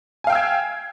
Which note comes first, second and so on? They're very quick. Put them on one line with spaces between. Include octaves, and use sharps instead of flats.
G#5 F5 G5 E6 G#6